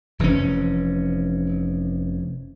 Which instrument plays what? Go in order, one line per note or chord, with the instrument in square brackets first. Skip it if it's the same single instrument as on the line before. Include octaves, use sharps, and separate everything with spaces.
[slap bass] F1 E3 F3 C#4